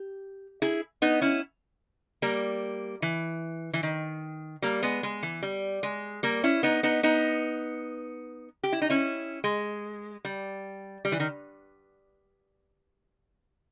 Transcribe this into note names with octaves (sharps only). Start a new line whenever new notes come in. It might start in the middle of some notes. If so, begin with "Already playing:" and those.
Already playing: G4
E4 G#4
B3 D#4
C#4 E4
G3 A#3
E3
E3
D#3
G3 A#3
G#3 B3
G#3
E3
G3
G#3
G3 A#3
C#4 E4
B3 D#4
B3 D#4
B3 D#4
G4
E4
D#4
C#4 E4
G#3
G3
G3
E3
D#3